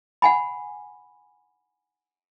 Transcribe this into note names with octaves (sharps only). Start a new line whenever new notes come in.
F#5 G#5 B5